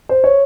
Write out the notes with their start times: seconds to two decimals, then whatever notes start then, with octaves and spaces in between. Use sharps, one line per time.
0.09 C5
0.24 C#5